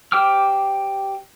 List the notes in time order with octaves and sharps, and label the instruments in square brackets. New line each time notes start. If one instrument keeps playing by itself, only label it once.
[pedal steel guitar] G4 C5 G5 D6 F6